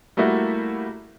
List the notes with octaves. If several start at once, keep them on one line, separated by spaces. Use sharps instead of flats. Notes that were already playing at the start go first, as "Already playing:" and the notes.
G3 A3 A#3 E4 F#4